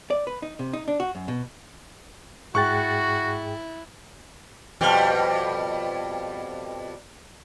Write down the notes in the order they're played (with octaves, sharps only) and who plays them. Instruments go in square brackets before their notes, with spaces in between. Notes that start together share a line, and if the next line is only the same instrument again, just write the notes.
[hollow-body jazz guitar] D5
B4
D#4
C3
D#4
D4
F#4
F#2
B2
[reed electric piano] G#2 G#4 G5 [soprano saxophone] E4 [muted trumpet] F#4 [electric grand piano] C#6 F#6 A6
[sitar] F2 B2 G3